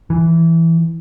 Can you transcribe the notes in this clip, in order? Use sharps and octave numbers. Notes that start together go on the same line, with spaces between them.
E3